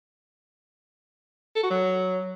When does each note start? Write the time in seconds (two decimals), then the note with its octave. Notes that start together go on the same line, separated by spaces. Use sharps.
1.56 A4
1.63 F#4
1.70 F#3